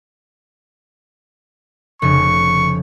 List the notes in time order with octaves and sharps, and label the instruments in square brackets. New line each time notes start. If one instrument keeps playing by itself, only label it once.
[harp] F1 C#3 [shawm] C#6